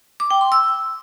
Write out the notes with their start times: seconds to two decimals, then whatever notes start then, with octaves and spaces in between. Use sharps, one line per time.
0.20 D6
0.31 G5
0.41 C6
0.52 E6